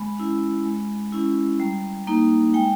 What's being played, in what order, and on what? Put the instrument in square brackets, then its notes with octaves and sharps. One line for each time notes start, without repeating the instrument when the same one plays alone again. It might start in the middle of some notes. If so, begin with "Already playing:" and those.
Already playing: [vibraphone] G#3 B5
C#4 E4
G#3
C#4 E4
G3
A#3 D#4
G#3 G5